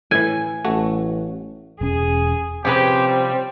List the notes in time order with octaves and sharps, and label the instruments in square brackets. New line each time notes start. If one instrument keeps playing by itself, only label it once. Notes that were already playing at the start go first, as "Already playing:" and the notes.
[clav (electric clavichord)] A2 E3 [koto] G#5
[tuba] A1 [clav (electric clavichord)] A3 F#4
[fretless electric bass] E1 C#4 [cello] G#4
[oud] C3 F3 [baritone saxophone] C4 [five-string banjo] C#4 G#4 B4 [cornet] G4
[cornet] G3